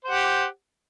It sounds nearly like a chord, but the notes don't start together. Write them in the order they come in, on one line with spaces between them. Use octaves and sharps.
C5 F#5 G4